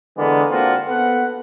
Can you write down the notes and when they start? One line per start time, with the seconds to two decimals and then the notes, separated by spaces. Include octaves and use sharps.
0.18 D3 E3 G#3 A#3 B3
0.51 A#3 C4 D4 F4 F#4
0.89 B3 A4 B4 F#5